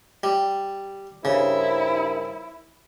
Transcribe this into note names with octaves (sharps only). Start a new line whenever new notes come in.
G3
G2 C#3 E4 A#4 C5